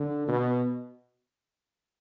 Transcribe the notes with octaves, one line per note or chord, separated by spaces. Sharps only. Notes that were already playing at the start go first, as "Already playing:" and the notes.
Already playing: D3
B2